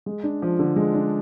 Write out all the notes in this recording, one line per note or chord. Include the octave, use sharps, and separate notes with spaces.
G#3
D4
F3
D3
G#3
D4